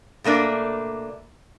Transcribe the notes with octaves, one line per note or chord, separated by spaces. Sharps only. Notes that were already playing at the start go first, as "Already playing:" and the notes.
B2 A3 A#3 D4 D5